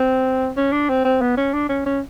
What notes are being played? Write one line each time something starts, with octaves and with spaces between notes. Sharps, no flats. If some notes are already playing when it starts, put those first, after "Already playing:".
Already playing: C4
C#4
D4
C4
C4
B3
C#4
D4
C#4
C#4